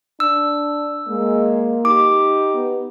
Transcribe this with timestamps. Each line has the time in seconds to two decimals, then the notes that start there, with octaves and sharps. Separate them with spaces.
0.20 D4 E6
1.08 G#3 A#3
1.85 D#4 G4 D6
2.54 B3